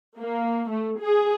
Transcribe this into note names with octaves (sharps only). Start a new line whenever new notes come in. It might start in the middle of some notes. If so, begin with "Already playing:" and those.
A#3
A3
G#4